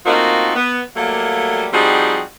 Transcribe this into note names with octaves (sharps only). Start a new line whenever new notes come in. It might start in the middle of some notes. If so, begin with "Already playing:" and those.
A3 A#3 C4 D#4 F4 F#4
B3
F#3 G3 A3 A#3
F3 G3 C4 D#4 F#4 G#4